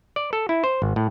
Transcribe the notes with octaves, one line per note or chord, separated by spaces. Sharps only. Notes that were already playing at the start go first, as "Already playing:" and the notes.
D5
A4
E4
C5
G#1
A2